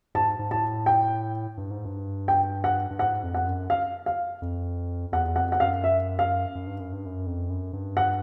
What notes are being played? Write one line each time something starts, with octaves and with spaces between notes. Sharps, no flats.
G#2 A5
G#2
A2 A5
G5
G2
G#2
G2
G5
F#5
G2
G#2 F#5
F2
F#5
F#2
F5
F5
F2
E2 F#5
F2 F#5
F#5
F#2 F5
E5
F5
F#2
G2
F#2
G2
F#2
F2
F#2
G2
F#5